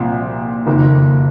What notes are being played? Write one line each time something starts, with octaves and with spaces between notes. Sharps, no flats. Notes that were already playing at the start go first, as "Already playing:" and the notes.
Already playing: C2 A#2 F3 C4
F#1 F2 D#3 A#3